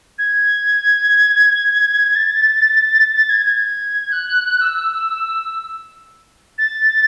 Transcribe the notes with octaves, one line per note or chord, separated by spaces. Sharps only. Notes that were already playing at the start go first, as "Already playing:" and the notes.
G#6
A6
A6
G#6
G#6
F#6
E6
A6